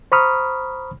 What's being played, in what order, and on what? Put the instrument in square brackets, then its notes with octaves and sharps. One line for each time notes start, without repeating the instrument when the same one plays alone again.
[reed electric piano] C5 A#5 B5 C#6 D#6 F6